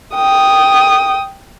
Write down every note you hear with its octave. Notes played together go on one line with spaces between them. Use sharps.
G5 D#6